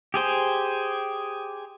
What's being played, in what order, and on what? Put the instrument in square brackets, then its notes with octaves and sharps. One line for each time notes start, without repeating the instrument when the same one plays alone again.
[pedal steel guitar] G4 G#4 C5